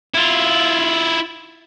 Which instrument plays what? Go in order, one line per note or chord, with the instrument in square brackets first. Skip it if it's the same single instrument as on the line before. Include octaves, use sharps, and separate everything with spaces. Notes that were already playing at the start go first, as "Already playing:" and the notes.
[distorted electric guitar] E4 F4